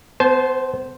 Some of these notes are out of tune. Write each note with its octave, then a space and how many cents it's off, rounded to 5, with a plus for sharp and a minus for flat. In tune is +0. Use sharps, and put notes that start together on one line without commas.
B3 +45 C5 +0 A5 -35